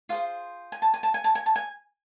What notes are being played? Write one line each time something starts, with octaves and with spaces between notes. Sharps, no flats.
F4 G#4 C5 F5
G#5
A5
G#5
A5
G#5
A5
G#5
A5
G#5